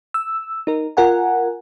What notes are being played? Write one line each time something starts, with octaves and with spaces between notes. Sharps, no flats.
E6
D#4 A#4
F4 A#4 F#5 G#5